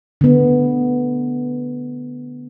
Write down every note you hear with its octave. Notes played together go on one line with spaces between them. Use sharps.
D3 B3